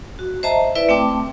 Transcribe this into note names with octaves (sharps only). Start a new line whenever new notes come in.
F#4
C5 D#5 E5 A5 A#5
E4 B4 D5 E5
A3 C4 G5 A5 D6